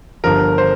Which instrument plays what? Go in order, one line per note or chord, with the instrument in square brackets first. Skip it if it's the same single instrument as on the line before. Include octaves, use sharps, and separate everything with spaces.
[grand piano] G1 G2 F3 A#4
C5